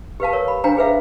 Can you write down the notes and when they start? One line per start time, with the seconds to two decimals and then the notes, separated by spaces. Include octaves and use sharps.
0.20 G4 B4 F5 A5
0.33 A#4 C#5
0.48 B5
0.64 D4 C5 F5 G5 G#5 A#5
0.77 G#4 B4 C5 E5 F5